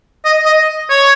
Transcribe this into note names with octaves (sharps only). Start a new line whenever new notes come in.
D#5
D#5
C#5